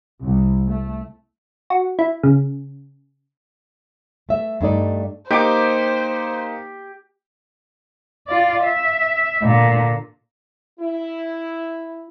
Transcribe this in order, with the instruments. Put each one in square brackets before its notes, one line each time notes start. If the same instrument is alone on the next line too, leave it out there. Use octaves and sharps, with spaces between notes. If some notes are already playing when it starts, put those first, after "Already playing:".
[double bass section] C2
A3
[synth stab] F#4
E4
C#3
[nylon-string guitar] A3 E5
G2 A3 D#4 D5
[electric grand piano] A#3 D#4 [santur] G4 D6 [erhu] C5
[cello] F4 D5
E5
A#2 D3
[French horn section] E4